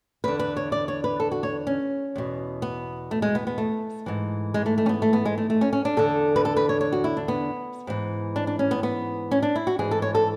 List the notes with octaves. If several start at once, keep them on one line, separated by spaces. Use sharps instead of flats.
E2 D3 B4
B4
C#5
D5
C#5
B4
A4
F#4
C#5
C#4
E2 B2
B3
A3
G#3
B3
B3
A3
G#2 E3
G#3
A3
A3
C#4
B3
A3
B3
G#3
A3
A3
C#4
C#4
D4
E2 D3 A4
B4
A4
B4
C#5
C#5
F#4
E4
D4
B3
G#2 E3
D4
D4
C#4
B3
B3
C#4
D4
E4
F#4
G#2 E3 G#4
A4
C#5
A4